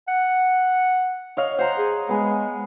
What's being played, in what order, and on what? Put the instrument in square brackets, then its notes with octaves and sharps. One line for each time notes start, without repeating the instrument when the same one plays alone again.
[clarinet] F#5
[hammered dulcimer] C#5 D#5 F5
[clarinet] C5 [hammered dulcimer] F#5 A#5 C6
[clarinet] G#4
[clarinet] G#3 [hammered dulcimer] B3 G#4